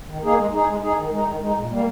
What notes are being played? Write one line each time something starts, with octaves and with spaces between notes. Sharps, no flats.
D#3
A#3 D#4 G#4
G#3
D#4 G#4
G#3
D#4 G#4
D#3
G#3 D#4
D#3
G#3 D#4
A#2
G3 A#3